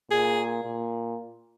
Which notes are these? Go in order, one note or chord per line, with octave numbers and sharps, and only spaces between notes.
A#2 G#4
A#2